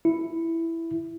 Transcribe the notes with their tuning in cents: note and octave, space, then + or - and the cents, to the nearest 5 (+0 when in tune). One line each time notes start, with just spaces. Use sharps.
E4 +5